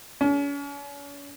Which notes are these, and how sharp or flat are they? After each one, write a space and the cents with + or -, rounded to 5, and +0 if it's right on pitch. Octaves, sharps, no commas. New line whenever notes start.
C#4 +40